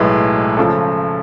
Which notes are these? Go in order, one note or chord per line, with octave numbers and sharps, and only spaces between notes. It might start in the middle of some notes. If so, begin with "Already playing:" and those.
Already playing: B1 A2 G#3 B4
C#3 F3 A4